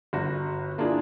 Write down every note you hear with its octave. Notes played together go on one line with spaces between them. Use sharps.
G1 F#4
A#3 D4 E4 F4 G#4